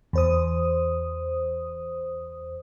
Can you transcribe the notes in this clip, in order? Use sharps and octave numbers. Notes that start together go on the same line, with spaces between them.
E2 C5 D#6